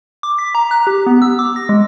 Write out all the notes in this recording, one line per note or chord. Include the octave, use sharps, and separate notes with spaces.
D6
B6
A#5
F#6
G4
B3
E6
D6
A#6
G#3